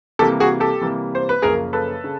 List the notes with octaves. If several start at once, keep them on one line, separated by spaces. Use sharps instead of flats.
C3 E3 G3 A#3 G4 A4
F#4 G#4
G4 A4
C3 E3 G3 A#3
C5
B4
F#2 C#3 F3 A#3 G#4 A#4
A4 B4
C#3